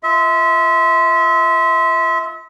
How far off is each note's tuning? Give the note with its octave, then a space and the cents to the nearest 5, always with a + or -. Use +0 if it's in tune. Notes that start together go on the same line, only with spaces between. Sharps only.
F4 -20 E5 -30